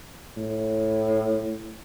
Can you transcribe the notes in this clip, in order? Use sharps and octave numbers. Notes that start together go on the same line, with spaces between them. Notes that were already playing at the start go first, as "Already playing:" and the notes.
A2